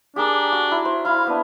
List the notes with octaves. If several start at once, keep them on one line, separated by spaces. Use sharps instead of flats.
D4 G4 G#4 A#4
F#4
E4
C5
E4 F5 B5
B3 D4